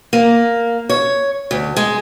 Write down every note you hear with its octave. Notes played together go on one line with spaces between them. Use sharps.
A#3
C#5
D2
G#3